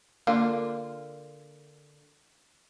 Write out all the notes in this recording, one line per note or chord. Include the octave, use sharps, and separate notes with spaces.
D3 A#3 F4